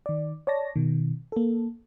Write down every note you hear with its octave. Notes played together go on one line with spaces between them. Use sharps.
D#3 D5
C#5 D5 A5 A#6
B2 D#3
A#3 A4